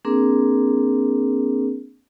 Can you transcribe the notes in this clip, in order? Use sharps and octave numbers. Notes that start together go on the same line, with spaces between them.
A#3 C4 D4 G#4 A#4